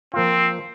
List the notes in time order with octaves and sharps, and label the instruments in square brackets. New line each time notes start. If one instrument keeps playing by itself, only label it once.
[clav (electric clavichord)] F3 A#3 F4 [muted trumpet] C4